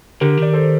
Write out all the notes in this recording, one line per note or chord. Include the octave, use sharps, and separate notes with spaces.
D3 G4 A#4
D#3
D5
A4 C5